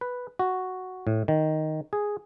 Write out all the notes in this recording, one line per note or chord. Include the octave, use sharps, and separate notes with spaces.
B4
F#4
A2
D#3
G#4